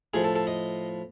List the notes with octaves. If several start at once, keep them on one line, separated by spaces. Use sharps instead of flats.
A2 F3 G#4
A4
A4
D#5